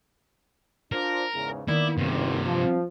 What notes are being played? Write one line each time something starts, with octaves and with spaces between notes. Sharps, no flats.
D4 F4 A#4 C5
E2 G#2 C#3
D#3 A#3 B3 E4 D5
F#1 G2 C3
F3 B3